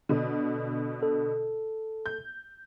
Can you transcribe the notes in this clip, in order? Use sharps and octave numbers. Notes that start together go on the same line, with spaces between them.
B2 D3
A4
G6